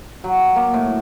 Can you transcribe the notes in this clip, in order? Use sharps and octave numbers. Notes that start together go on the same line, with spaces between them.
F#3
A#3
A2